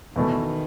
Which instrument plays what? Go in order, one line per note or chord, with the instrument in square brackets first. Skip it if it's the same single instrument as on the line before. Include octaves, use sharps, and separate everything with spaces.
[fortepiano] E2 B2 A3 [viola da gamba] D#3